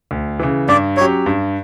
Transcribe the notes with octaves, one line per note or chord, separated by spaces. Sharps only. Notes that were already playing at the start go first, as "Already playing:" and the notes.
D2
C#3 E3
G2 D5
F#3 C#4 G4 C#5
G2